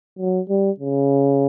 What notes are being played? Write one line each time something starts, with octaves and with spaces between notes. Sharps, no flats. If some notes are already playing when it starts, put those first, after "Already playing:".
F#3
G3
C#3